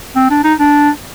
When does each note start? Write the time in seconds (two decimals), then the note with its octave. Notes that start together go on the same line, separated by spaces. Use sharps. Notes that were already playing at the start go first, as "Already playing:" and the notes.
0.15 C4
0.30 D4
0.44 D#4
0.60 D4